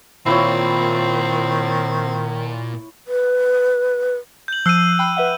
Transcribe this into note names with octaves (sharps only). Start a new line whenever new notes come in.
A#2 D#3 C4 E4 F4 C#5
B4
G6 F#7
F3 E6 F#6 C7 D#7
G5 B5 F#6
B4 E5 F#5